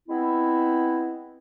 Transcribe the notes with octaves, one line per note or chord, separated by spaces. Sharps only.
G#3 B3 C4 E4